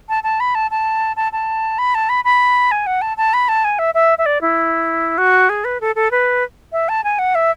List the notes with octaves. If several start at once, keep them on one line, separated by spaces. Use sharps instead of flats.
A5
A5
B5
A5
A5
A5
A5
B5
A5
B5
B5
G#5
F#5
A5
A5
B5
A5
G#5
E5
E5
E5
D5
E4
F#4
G#4
B4
A4
A4
B4
E5
A5
G#5
F#5
E5